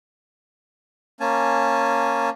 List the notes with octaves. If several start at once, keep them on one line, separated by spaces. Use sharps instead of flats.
A#3 C#4 G#5 A5